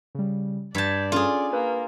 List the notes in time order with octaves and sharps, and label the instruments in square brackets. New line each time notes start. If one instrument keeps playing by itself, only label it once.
[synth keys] C#3 G3
[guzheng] G2 A5 [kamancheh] D5 [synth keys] G6 G#6 B6
[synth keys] C#4 A4 [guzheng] F4 G#4
[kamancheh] A#3 [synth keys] B4